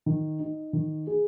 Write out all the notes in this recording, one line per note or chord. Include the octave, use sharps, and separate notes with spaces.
D#3
D#4
D#3
G#4